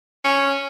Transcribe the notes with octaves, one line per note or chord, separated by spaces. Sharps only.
C#4